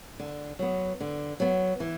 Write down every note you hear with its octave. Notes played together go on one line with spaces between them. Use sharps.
D3
F#3 B3
D3
F#3 B3
E3